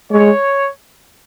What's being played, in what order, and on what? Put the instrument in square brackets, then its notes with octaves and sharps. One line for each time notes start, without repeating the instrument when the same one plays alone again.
[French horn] G#3 [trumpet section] C#5